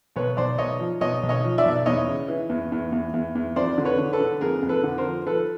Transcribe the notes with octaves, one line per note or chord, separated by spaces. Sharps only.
B1 B4 C#5
B1 C5 D5
B1 C#5 D#5
F3
B1 C#5 D#5
B1
C#5 D#5
F3
D5 E5
B1
E2 C#5 D#5
C#3
E3
E2
E2
E2
E2
E2
F2 C5 D5
D3
B4 C#5
D3
A4 B4
D3
F2 G#4 A#4
F2
A4 B4
D3
A#4 C5
F3
F3 A4 B4